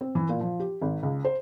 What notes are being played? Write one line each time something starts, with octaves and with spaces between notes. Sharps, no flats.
C4
E3
A#2
F3
G4
G#1
C#2
C5